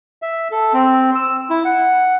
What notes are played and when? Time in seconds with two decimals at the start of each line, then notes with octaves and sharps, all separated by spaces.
0.22 E5
0.51 A4
0.74 C4
1.15 E6
1.50 E4
1.65 F#5